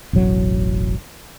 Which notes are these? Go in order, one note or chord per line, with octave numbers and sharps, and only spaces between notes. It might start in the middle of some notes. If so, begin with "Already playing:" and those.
E1 A1 F#3